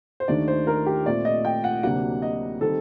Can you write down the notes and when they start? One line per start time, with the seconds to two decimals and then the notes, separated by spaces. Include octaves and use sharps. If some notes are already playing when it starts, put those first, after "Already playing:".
0.20 C5
0.28 D#2 D#3 A3 D4 D5
0.48 C5
0.67 A#4
0.86 G4
1.06 A#2 A3 C4 D5
1.25 D#5
1.45 G5
1.64 F#5
1.83 D2 C3 F#3 A#3 D4 F#5
2.22 D#5
2.61 D#3 G3 C4 A4